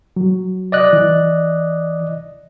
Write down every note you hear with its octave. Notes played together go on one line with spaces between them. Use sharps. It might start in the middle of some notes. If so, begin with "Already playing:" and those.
F#3
D5 D#5 F#6
E3